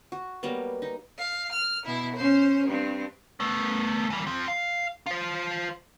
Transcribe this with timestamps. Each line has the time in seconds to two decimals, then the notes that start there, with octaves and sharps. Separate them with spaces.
0.12 F#4
0.43 F#3 G3 A#3 B3
0.82 D#4
1.18 F5
1.51 F6
1.85 B2 E4
2.16 C#4 C5
2.67 G2 C4
3.40 A3 B3
4.10 E3 G3
4.27 F3 C4
4.48 F5
5.06 F4 C5